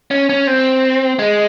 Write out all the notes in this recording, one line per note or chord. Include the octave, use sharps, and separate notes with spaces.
C#4
C#4
C4
G#3